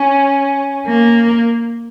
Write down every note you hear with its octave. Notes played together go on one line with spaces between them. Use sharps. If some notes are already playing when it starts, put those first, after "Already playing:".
Already playing: C#4
A#3